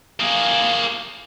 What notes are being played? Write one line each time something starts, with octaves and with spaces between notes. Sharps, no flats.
A#3 G#4